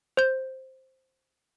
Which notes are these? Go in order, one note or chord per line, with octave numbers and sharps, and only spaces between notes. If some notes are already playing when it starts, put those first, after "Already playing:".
C5 G6